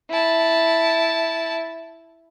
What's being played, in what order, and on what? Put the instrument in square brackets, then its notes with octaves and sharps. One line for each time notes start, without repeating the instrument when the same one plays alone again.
[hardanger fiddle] E4 A5